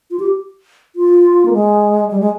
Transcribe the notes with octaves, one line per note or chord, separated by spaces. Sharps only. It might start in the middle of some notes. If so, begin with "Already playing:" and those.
F4
G4
F4
A#3
G#3
G3
G#3